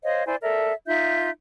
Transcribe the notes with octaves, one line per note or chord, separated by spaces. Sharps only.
C5 C#5 D#5 F5
E4 C5 D5 G#5
A4 A#4 D5 E5
D#4 F4 E5 G6